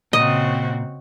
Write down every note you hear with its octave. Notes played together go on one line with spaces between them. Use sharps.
A#2 C#3 C4 F#4 D#5